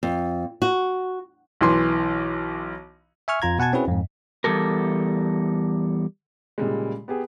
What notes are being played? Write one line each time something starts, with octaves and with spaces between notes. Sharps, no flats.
F2
F#4
B1 E3 C6
E5 G#5 C#6 F6
F2 F4 A#5 G#6
B2 F#5 G#5 A5 G#6
C4 C#4 E4 F#4 G#4 B4
F2 G#2
E2 D#3 G3 A4 A#4
A#2 C#3 G3 G#3
B3 G4 G#4